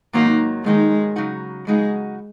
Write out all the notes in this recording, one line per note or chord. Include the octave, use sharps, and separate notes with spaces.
G#2 D#3 F#3 A#3 D#4
G#2 D#3 F#3 G#3 D#4
C#3 F#3 D#4 F#4
C#3 F#3 G#3 D#4 F#4